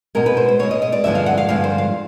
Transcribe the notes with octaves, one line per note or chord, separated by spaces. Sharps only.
B2 G#3 A#4
B4
C5
C5
B2 G#3 C#5
D#5
D#5
D5
G2 D3 F3 G#3 E5
F5
F#5
F5
G2 D3 F3 G#3 F5
C5
F5